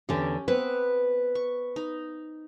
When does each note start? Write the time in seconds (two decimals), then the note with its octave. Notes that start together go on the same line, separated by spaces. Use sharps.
0.09 E2 D3 C#4 G4
0.48 B3 C4 B4
1.35 C#6
1.76 D#4